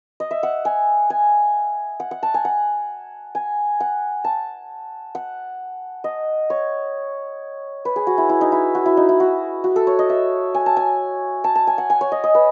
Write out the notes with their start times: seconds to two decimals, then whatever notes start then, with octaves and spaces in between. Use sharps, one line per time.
0.20 D#5
0.31 E5
0.43 F#5
0.65 G#5
1.10 G#5
2.00 F#5
2.11 F#5
2.23 A5
2.34 G#5
2.45 F#5
3.35 G#5
3.80 F#5
4.24 A5
5.15 F#5
6.04 D#5
6.50 C#5
7.85 B4
7.96 G#4
8.07 F#4
8.18 E4
8.29 E4
8.41 D#4
8.52 E4
8.75 F#4
8.86 E4
8.97 D#4
9.09 E4
9.20 F#4
9.64 F#4
9.76 A4
9.87 C#5
9.99 D#5
10.09 E5
10.55 G#5
10.66 A5
10.77 G#5
11.44 A5
11.55 A5
11.67 G#5
11.78 F#5
11.90 G#5
12.01 C#5
12.12 D#5
12.24 D#5
12.35 B4